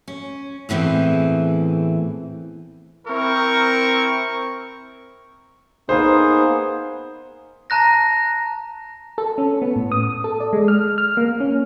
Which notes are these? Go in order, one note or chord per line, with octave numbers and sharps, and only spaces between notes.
C#4
E2 A2 E3 C4 G#4
C4 E4 A#4 C#6
A#3 B3 D#4 G#4 C5
A5 A#5 F#6 A#6
A4
C#4
B3
A2
D#6
A4
D5
G#3
F6
F6
A#3
C#4